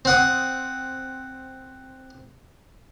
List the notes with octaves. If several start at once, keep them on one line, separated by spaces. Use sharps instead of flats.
C4 F#5 D#6